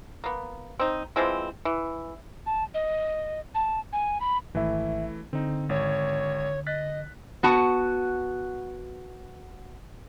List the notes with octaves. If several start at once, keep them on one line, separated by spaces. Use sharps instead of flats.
A#3 B3
C4 D#4
E3 F3 G#3 C4
E3
A5
D#5
A5
G#5
B5
G#1 E3 A3 E4 E5
D3 C4 D#4
G#1 C#5
D#5 F#6 A6 B6
B3 F#4 A5